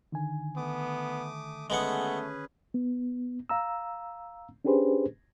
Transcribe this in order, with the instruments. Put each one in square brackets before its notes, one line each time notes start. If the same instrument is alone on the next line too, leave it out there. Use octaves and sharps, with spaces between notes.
[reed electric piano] D3 D#3 G#5
[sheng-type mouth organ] A3 D6 D#6 [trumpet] B3
[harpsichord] G#3 B3 F#5 [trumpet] A3 [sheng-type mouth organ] C#4 G#4 B4
[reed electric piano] B3
F5 A#5 E6
C#4 D4 G4 G#4 B4 C5